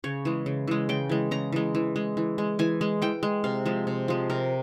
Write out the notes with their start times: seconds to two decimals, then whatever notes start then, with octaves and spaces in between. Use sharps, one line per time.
0.04 C#3 C#5
0.25 E3 G#3
0.46 C#3
0.68 E3 G#3
0.89 C#3 G5
1.09 E3 G#3
1.31 C#3 A#5
1.52 E3 G#3
1.75 E3
1.96 G#3
2.17 E3
2.38 G#3
2.59 E3 G#5
2.81 G#3
3.02 E3 G5
3.23 G#3
3.44 C3 F5
3.66 F3 G#3
3.87 C3
4.08 F3 G#3
4.30 C3 A#4